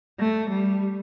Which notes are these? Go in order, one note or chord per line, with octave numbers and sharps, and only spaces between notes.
A3
G3